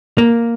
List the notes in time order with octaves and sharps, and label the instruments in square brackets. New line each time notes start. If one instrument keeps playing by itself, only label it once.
[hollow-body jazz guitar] A#3